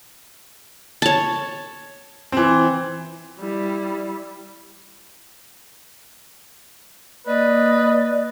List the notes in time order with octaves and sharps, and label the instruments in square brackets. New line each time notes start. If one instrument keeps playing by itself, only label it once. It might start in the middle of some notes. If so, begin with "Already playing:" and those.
[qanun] C#5 A5
[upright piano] E3 C4
[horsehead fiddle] G3 E4
[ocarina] A#3 [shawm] B4 [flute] D5 [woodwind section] D#5